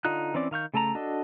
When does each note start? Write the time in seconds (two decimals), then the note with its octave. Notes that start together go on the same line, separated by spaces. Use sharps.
0.05 D3 D#4 F4 F#6
0.34 E3 C4 C#4 D5 D6
0.51 D#3 F5 C#6 G6
0.74 C#3 A3 A4 A5 A#5
0.95 D4 F#4 A4 D#5